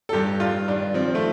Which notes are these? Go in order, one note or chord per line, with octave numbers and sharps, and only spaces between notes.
A4
G2 G4
G2 F4
G2 D4
F3 C4
A3